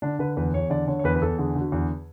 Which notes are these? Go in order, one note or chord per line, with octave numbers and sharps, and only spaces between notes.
D3 D4
D3 B4
E2 B4
E2 C#5
D3 D5
D3 C#5
C#5
E2 B4
B4
E2 A4
D3 G#4
D3
F#4
E2